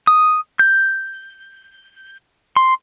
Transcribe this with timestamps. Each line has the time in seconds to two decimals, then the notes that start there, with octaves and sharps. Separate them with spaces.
0.07 D#6
0.59 G6
2.56 C6